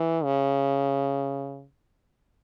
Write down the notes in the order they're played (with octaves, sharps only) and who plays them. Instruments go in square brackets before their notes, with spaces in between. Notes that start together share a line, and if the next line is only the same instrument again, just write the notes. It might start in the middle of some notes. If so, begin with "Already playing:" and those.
Already playing: [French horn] E3
C#3